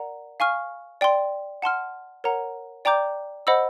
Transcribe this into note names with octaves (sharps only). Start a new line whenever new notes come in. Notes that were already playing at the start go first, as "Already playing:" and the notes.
Already playing: A#4 D5 F#5 A#5
F5 G#5 C#6 F6
D5 G5 C6
F#5 A5 C6 F6
A#4 C#5 F#5 A#5
D5 G5 A#5 D6 G6
C5 D#5 F#5 B5 E6